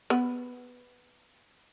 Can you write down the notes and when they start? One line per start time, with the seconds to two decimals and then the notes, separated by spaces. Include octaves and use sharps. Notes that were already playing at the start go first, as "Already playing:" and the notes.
0.10 B3 B4